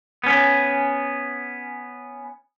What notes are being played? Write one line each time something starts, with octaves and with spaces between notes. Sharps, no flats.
B3 C#4